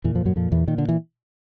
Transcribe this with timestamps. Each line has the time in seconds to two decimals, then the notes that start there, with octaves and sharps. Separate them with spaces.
0.04 E2 A#2 E3
0.15 F2 F3
0.25 F#2 F#3
0.36 F2 A#2 F3
0.52 E2 E3
0.67 A#2 D#3
0.78 D3
0.89 E3